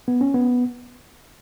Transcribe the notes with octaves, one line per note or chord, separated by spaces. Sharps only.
B3
C#4
B3